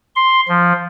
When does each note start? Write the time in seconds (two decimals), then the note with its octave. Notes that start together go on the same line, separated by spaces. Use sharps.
0.16 C6
0.48 F3